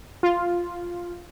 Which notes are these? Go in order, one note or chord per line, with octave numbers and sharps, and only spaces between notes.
F4